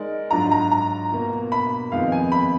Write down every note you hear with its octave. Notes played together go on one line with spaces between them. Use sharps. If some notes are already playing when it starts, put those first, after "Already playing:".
Already playing: G#3 D#4 A#4 D5
G#2 F#3 D4 F4 A#5
A#5
A#5
B2 A#3 F4
B5
F2 D#3 G#3 B3 F4 F5
G#5
B5